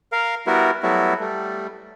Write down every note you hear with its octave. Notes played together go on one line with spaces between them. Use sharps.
A#4 F5
G3 B3 E4 F#4 A#4
F#3 G3 A3 B3 E4 F#4
G3 A3